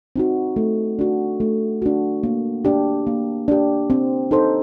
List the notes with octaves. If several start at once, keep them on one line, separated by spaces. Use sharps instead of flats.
C4 D#4 F#4
A3
D4 F#4
A3
D4 F#4
A#3
D4 G4
A#3
D4 G4
C4
D#4 A4 C5